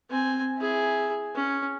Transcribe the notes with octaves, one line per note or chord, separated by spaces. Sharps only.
C4 G#5
E4 G#4
C#4